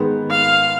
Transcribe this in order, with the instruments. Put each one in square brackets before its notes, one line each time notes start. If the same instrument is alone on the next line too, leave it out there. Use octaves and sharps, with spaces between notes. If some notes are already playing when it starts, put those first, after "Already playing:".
Already playing: [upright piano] G#2 D#3 G#3 B3
[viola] F5